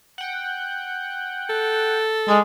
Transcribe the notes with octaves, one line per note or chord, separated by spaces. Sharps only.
F#5 G5
A4
G#3 G#4 D5